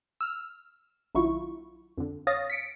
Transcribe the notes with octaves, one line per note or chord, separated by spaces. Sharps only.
E6 F6
A#1 D#3 F#3 E4 F4 C#6
F2 D3
C#5 F5 D#6 A6 A#6
B6 C#7 D7